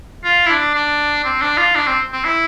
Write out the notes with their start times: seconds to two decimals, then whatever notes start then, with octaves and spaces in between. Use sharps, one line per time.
0.24 F4
0.46 E4
0.49 D4
0.75 D4
1.24 C4
1.42 D4
1.58 F4
1.76 D4
1.87 C4
2.13 C4
2.25 E4